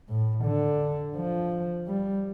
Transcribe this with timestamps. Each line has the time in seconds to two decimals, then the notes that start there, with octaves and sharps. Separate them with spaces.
0.10 A2
0.45 D3
1.17 F3
1.88 G3